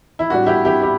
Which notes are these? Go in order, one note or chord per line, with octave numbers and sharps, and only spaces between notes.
E4
A2 G3 D4 F#4
E4 G4
E4 G4
E4 G4